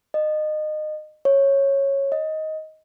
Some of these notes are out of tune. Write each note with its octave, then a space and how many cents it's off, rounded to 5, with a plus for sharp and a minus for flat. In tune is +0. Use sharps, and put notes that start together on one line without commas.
D#5 -25
C#5 -10
D#5 +10